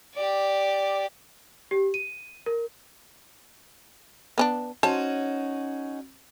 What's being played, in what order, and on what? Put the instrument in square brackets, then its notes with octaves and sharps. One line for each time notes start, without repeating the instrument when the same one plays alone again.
[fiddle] G4 D5
[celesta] G4
D#7
A#4
[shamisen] B3 C#4 D4
[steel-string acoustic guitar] C#4 D#4 F#4 [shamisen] C5 C#5 A5